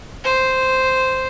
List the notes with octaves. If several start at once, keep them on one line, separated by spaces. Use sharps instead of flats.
C5